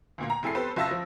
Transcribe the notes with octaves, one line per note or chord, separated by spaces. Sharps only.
D2 A#2 A#3
A#5
F1 E4 G#4 A4 C7
B3 G4 A4 B4 C5
F#1 F4 E5 A5 E6 A#6
F3